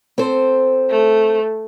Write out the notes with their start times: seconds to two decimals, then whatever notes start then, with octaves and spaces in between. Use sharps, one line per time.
0.18 C4 A4 C5
0.90 A3